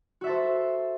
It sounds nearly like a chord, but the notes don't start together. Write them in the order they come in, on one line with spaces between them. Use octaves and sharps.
F#4 E5 A4 C5